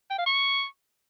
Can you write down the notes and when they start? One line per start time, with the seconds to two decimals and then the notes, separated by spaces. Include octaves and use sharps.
0.10 G5
0.18 F5
0.26 C#6